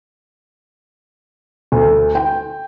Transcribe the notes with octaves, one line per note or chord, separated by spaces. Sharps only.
D2
G5